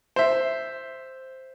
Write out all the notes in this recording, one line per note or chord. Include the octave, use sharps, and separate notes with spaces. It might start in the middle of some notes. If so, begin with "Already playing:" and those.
C5 E5